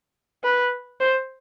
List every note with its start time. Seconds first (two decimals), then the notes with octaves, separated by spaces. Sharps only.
0.44 B4
1.00 C5